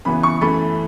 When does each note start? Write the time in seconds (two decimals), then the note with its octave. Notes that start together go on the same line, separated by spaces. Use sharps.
0.05 F#2 C#3 E3 B3 B5
0.23 C#6
0.41 F#2 E3 A3 B5